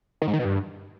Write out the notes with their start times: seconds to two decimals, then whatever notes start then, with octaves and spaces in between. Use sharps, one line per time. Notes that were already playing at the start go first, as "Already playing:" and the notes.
0.22 D#3
0.27 G#2
0.33 D#3
0.39 B2
0.45 G2